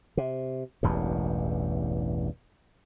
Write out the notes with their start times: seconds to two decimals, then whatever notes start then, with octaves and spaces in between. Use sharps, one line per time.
0.17 C3
0.83 E1 A1 E2 G2